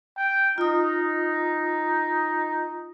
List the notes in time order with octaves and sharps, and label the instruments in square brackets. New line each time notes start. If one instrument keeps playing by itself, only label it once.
[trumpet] G5
[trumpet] D#4 [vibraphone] F4 D#6